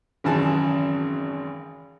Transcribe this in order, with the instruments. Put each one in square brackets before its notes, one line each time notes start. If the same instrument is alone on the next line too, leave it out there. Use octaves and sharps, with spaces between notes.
[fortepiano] G#1 F#2 C#3 E3 G#4 A5